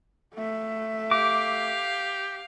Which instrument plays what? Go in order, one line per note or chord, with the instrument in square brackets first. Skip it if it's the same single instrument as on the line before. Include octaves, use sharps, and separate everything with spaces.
[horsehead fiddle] A3 E5
[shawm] G4 [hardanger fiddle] F5 [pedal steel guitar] D6